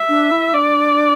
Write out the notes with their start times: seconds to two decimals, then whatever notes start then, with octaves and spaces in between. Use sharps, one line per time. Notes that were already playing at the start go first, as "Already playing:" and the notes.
Already playing: E5
0.09 D4
0.31 E4
0.54 D4 D5